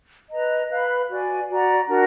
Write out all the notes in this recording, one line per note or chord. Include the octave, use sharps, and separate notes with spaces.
B4 D#5 A#5
B4 F5 B5
F#4 D5 G#5
F#4 D5 F#5 A#5
D4 F#4 A#4